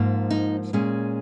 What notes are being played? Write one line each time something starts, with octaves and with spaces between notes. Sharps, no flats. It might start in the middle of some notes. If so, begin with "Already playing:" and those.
Already playing: G#2 F3 A#3
D#4
A#2 G#3 C#4